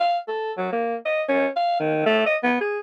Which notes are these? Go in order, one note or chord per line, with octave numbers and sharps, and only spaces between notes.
F5
A4
F#3
A#3
D#5
C#4
F5
D#3
A3
D#5
B3
G#4